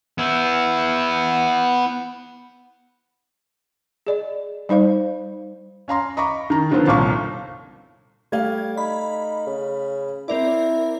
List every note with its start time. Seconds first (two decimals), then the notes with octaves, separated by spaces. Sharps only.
0.18 B3 E4
4.07 G#4 D5 D#5
4.69 G3 D#4 C5 F5
5.88 C#4 F5 A#5 C6
6.17 D#5 A#5 B5 C#6 D6
6.50 D#3 A#5
6.71 D3 D#3 F3 B3 C4
6.87 G1 C2 A#2 F5 A5 C#6
8.32 G3 A3 F5 G#6
8.77 D#4 B5
9.47 C#3
10.28 C4 E4 A#4 D5